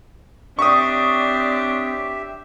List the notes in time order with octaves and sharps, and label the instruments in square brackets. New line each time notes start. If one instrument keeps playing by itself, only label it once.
[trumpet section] C4 C#5 D5 [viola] D4 [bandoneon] G4 E5 [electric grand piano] C#6 D#6